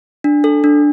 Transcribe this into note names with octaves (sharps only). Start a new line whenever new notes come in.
D4
A4
D4